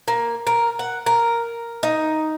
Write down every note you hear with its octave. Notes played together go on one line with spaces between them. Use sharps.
A#3
A#4
F#5
A#4
D#4